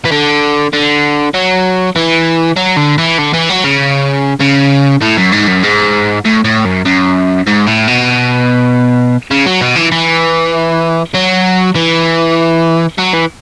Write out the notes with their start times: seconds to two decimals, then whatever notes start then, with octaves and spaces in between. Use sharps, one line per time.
0.05 E3
0.12 D3
0.73 D3
1.34 F#3
1.96 E3
2.57 F#3
2.77 D3
2.98 E3
3.18 D3
3.33 E3
3.49 F#3
3.64 C#3
4.40 C#3
5.02 A2
5.17 F#2
5.32 G#2
5.48 F#2
5.63 G#2
6.25 A2
6.44 A2
6.65 F#2
6.86 F#2
7.47 G#2
7.67 A2
7.87 B2
9.31 C#3
9.46 F#3
9.61 B2
9.76 E3
9.92 E3
11.14 F#3
11.75 E3
12.98 F#3
13.13 E3